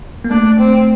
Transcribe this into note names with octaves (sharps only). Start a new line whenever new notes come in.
A#3
A3 D4
C4